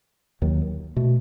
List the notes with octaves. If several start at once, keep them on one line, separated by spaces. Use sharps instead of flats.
D#2 D#3 F#3
B2 A3